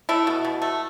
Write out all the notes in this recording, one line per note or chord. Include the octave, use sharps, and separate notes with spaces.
A3 E4
B2
B2
A3